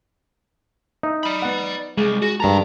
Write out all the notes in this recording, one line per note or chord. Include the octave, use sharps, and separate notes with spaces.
D#4 E5
D5 B5
B3 F#5
C2 G#3
F#4 G#4
G2 D#3 A#4 A5 A#5